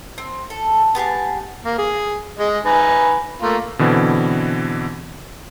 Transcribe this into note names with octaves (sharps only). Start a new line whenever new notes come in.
C4
A4
B3 G4 G#4 A5
A#3
G#4
G#3 D#5
D#4 B4 G#5
A3 A#3 F4
B2 D3 E3 C4